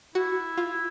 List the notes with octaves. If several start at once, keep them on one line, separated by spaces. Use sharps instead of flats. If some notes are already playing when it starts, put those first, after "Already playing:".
E4 F#4
F4